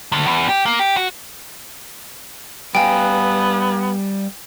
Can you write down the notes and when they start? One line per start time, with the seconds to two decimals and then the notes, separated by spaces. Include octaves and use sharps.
0.12 D2
0.27 E2
0.49 G4
0.66 A#3
0.79 G4
0.97 F#4
2.75 G3 B3 F5 G5 G#5